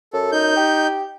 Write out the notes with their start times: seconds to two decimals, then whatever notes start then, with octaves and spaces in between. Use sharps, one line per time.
0.13 F#2 A4
0.32 D#4 G6
0.56 G4